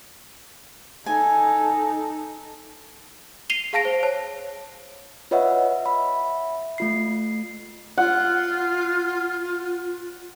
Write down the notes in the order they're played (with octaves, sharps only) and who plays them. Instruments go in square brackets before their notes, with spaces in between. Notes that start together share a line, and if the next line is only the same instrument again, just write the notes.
[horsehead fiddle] D#4 A4 [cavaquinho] G#5
[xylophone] C7 D#7 F7 G7
G#4 F5 A5 A#6 D7
C5
C#5 A5
[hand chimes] F4 B4 C#5 D#5 E5 F#5
E5 B5
A3 F4 C7
[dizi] F4 [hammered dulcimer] F#5